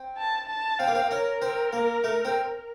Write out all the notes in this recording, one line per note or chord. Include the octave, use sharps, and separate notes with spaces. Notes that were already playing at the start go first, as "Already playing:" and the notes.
Already playing: C4
A5
A5
C4 F5
A#3
C4
C#4 A#4
C4
A#3
A3
C4